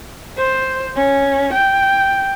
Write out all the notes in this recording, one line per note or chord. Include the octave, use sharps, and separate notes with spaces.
C5
C#4
G5